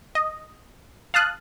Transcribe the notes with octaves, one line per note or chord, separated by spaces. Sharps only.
D#5
F5 A5 D#6 F#6